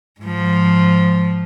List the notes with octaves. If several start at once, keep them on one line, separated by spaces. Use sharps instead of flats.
G#2 F3